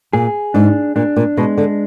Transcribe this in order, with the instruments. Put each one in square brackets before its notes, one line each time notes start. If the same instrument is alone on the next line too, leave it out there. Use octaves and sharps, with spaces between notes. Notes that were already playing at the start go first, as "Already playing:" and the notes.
[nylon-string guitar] A#2 [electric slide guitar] G#4
[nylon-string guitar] G#2 [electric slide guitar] D4
[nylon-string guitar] A#2 [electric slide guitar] D4
[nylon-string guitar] A#2
[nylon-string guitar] B2 [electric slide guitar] G#3
[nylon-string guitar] D3